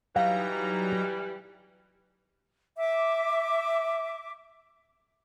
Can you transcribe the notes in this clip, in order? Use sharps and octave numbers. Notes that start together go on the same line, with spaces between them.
E3 F#3 G3 D#4 F5 A#5
E5 D6